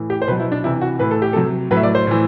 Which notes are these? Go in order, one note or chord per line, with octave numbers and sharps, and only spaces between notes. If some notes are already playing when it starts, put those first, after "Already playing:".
Already playing: A2 E3
G4
C5
B2 F#3 B4
E4
D4
C3 E3 E4
F#4
A2 E3 B4
A4
G4
C3 F#3 A4
A2 F#3 B4
E5
D5
C5
A2 E3